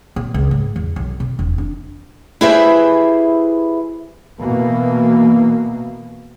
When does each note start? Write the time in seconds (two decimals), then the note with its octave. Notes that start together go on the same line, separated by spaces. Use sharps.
0.16 A#2
0.34 C#2
0.51 G#2
0.76 E2
0.96 B1
1.20 B2
1.39 E1
1.58 D4
2.41 E4 G4 G#4 B4 C5 E5
4.40 B2 E3 A#3